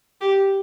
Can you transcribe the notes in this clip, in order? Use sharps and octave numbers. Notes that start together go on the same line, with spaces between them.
G4